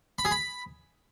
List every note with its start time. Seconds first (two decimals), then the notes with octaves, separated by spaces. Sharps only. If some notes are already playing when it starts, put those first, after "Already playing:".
0.19 B5
0.25 G#4
0.31 B5